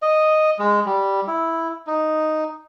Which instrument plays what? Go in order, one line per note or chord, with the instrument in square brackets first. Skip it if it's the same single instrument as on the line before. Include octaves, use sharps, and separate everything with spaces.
[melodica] D#5
G#3
G3
E4
D#4